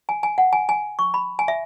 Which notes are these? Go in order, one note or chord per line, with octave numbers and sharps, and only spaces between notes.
G#5
G#5
F#5
G#5
G#5
C#6
B5
G#5
E5